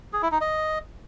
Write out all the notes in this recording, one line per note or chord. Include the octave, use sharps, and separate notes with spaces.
G#4
E4
D#4
D#5